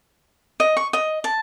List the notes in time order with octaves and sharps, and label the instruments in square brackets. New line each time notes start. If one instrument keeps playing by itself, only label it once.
[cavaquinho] D#5
C#6
D#5
A5